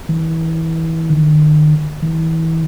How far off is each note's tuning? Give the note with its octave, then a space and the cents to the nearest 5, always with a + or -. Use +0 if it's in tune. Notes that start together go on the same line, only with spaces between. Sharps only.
E3 -25
D#3 -40
E3 -30